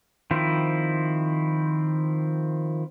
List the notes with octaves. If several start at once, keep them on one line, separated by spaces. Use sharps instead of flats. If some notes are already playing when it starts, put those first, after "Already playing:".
D#3 F3 C4 E4